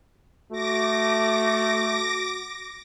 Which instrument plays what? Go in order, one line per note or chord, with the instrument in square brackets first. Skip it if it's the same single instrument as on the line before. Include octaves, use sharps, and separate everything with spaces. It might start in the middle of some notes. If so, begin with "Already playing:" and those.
[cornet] A3 [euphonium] F#4 [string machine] D6 A#6